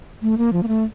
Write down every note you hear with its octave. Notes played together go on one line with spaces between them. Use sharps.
A3
A#3
F3
A#3
A3